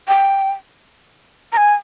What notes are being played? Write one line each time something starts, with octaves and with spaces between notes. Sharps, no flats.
G5
A#5
G#5